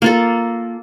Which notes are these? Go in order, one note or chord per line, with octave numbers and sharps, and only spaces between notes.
A#3 F4 A4